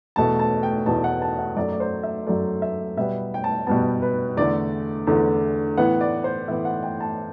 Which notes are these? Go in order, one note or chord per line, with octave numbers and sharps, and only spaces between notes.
E2 B2 A3 A5
A5
G5
E2 B2 A3 A5
F#5
A5
F#5
F#2 F#3 A3 D5
D5
C5
E5
F#2 F#3 A3 D5
E5
B2 G3 B3 E5
G5
A5
B2 G3 B3 A5
B4
E2 D3 A3 D5
E2 D3 A3
A2 E3 B3 F#5
D5
C5
A2 E3 B3 E5
F#5
G5
A5